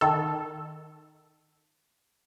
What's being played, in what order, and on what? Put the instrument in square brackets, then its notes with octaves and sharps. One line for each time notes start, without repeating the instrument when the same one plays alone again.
[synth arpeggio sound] D#3 A4